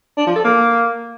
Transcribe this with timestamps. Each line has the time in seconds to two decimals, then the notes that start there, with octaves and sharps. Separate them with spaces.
0.17 D4
0.26 F3
0.35 A4
0.44 A#3